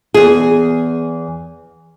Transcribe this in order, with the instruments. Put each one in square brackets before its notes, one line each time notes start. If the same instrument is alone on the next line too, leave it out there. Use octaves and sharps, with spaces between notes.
[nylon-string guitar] E2 G#4